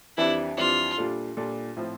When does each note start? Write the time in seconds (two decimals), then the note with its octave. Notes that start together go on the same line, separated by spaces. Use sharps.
0.17 F2 E3 G3 D4 E4
0.57 F2 E3 G3 D4 F4
0.98 A#2 G3 D4 F4 A4
1.37 A#2 G3 D4 F4 A4
1.77 A2 F3 C4 F4